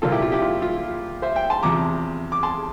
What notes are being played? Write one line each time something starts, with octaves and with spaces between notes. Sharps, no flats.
C2 A#2 F3 A#3 F4 A4
E4 G4
F4
E4 G4
F4
F4
C5 E5
E5 G5
A5 C6
E2 C3 F3 A#5 D6
D6
A5 C6